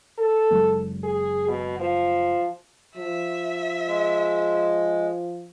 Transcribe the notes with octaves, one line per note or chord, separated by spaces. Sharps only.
A4
F#1 F#3 G#3
G#4
B2
F3
F3 E5
G#3